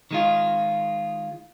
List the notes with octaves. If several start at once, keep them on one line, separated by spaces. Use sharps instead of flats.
D#3 G#3 F4